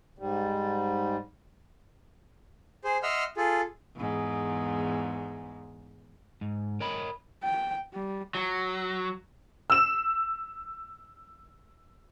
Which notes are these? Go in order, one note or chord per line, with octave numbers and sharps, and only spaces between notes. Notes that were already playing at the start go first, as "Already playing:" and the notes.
G#2 G3
G#4 C5
D#5 E5 F#5 C6 E6 F6
F4 G#4 A4
E2 G#2
G#2
A#4 C#5 D#5 G5 B5
G5
G3
F#3
E6 E7